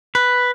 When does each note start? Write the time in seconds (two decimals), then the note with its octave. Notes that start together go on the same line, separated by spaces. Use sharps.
0.15 B4